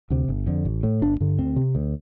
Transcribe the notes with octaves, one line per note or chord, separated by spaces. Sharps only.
D2 C3
G1
F2 D3
A1
A2
G1 D4
G2 D3
D2 C4
C3
D2